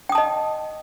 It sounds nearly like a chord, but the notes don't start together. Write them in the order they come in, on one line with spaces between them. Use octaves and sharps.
G5 D#6 A5 D#5